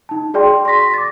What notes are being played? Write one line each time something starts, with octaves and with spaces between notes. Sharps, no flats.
D#4 A5
F#4 G#4 D5 G5 C6
C6 C#6 A#6 B6
D6 A6